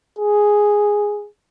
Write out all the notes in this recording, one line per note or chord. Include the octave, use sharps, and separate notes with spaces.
G#4